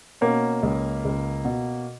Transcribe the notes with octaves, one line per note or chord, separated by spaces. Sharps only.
B2 A#3 C#4
C#2
C#2
B2